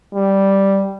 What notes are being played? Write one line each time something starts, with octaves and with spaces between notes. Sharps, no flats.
G3